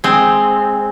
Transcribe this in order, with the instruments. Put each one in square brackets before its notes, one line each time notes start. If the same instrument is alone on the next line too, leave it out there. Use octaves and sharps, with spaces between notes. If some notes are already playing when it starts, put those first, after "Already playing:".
[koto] G#3 C4